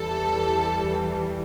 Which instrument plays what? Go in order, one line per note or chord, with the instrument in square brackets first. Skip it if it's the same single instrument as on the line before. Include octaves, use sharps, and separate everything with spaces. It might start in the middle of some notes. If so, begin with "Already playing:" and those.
Already playing: [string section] E2 E3 G3 A4